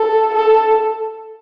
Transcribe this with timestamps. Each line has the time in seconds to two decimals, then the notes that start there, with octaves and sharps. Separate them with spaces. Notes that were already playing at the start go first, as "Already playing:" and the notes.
Already playing: A4
0.34 A4